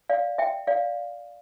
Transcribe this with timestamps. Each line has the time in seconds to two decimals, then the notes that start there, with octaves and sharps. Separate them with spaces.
0.09 D5 F5
0.38 E5 G5
0.67 D5 F5